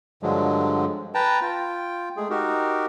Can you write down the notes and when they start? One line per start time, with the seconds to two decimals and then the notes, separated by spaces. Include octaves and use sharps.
0.23 G2 D3 F3 F#3 G#3
1.14 B4 G5 A5 A#5
1.41 F4 G5
2.17 G#3 A3 G#4
2.30 D#4 F#4 G4 A#4